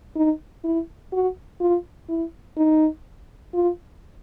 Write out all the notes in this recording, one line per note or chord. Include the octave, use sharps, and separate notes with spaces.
D#4
E4
F#4
F4
E4
D#4
F4